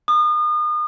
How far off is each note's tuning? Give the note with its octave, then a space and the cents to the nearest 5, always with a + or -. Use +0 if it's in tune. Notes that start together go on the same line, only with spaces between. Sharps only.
D#6 -35